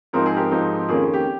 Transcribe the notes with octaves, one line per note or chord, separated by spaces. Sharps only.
G#2 F3 C4 D#4 A#4
G#4
G4 A#4
G#2 F3 C4 D#4
F2 D#3 A#3 C#4 F4 G#4
G4